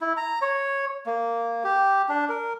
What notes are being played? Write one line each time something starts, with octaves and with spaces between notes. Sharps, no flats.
E4
A#5
C#5
A#3
G4
D4
A#4